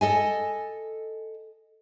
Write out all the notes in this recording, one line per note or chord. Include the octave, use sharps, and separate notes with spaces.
A4 D#5 G#5